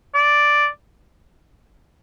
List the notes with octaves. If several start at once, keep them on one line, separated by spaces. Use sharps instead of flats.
D5